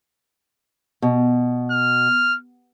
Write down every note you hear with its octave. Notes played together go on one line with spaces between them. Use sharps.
B2
F6